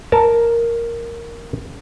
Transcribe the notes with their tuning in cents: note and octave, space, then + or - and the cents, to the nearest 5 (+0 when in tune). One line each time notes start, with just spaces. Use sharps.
A#4 +0 A5 +0